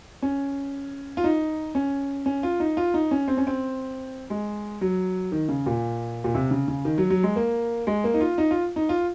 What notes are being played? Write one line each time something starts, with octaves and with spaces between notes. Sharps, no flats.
C#4
F4
D#4
C#4
C#4
F4
D#4
F4
D#4
C#4
C4
C#4
C4
G#3
F#3
D#3
C#3
A#2
A#2
C3
C#3
C#3
D#3
F#3
F#3
G#3
A#3
G#3
A#3
D#4
F4
D#4
F4
D#4
F4